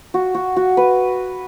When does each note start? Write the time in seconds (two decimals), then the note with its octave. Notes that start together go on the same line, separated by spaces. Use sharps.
0.14 F#4
0.35 F#4
0.56 F#4
0.77 B4